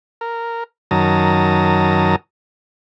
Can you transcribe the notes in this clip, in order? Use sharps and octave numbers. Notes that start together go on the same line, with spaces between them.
A#4
F#2 D#3 F#3 A5 A#5 D#6